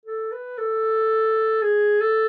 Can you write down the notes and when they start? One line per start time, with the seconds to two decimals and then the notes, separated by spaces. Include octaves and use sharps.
0.06 A4
0.32 B4
0.58 A4
1.62 G#4
2.01 A4